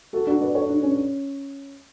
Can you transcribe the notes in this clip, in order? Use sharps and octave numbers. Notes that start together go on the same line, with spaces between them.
F#4 A4
D4 F#4
B4 D5
A4 C#5
D4
C#4